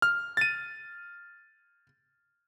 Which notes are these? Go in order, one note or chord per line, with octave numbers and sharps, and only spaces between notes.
F6
A6 D#7